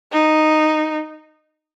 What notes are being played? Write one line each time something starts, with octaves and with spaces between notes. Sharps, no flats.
D#4